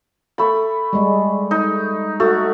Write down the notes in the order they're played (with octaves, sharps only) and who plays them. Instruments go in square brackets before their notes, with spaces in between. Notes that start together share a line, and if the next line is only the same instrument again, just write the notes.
[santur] A3 B5
[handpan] G3 G#3
[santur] D#4
[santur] A3 [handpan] F#4